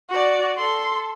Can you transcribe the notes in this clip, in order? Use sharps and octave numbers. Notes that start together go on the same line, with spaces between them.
F#4 D5
A4 C6